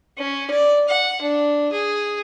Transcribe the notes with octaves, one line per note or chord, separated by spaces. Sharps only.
C#4
D5
F#5
D4
G#4